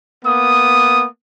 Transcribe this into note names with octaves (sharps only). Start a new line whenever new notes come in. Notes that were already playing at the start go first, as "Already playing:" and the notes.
A#3 B3 D#6